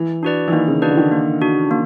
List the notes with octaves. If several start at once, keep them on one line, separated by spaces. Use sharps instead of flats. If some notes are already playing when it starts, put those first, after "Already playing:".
Already playing: E3
D4 F#4 B4 D5
E3
D#3 A#3
C#3
D4 F#4 B4 D5
D3
D#3
A#3
D4 F#4
A#3